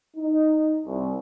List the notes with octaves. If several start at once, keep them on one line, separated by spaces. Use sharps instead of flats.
D#4
C2